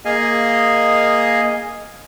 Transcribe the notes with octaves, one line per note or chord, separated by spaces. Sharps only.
A#3 G#4 D#5 F5 G#5